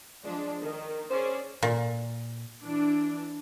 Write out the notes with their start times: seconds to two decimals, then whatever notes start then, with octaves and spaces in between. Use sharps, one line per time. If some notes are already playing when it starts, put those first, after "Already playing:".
0.24 F3 G#3 D4
0.62 D#3
1.10 C#4 G#4 C5 D5
1.63 A#2
2.62 E3 D4